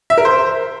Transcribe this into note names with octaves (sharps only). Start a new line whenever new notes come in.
E5
A#4
C5